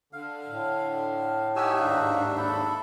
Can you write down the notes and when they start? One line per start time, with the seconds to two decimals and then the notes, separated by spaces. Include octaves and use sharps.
0.13 D3 F5
0.47 A2
1.56 D#4 F#4 G4 E5 G#5 E6
1.78 D#2 G#2 D4 F5
2.37 A4 E5 B5